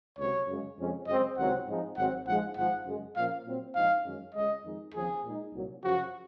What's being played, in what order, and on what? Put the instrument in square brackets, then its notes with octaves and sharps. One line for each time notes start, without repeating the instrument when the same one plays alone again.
[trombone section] C#2 C3 F#3 [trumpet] C#5
[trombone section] F#2 C#3 G#3
F2 C#3 G#3 C#4
[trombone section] F#2 C#3 G#3 C4 [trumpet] D#5
[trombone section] C#2 C3 D#3 F#3 C4 [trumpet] F#5
[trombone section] G#2 F3 G#3 C4 D#4
[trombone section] G#1 G#2 F#3 C4 [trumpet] F#5
[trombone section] A#1 G#2 F3 G#3 D#4 [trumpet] F#5
[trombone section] G#1 G#2 F3 [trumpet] F#5
[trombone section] F#2 C#3 G#3
[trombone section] A#2 F3 A#3 C#4 [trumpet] F5
[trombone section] A#2 F#3 C4
[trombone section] A#1 G#2 F3 C4 D#4 [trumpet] F5
[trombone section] F#2 D#3 G#3 C#4
[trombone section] C#2 C#3 G#3 [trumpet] D#5
[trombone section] F2 D#3 G#3 D#4
[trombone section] D#2 C#3 F3 C4 [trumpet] G#4
[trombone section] A#2 G#3 D#4
C2 A#2 F#3
[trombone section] F#2 C#3 F3 [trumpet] F#4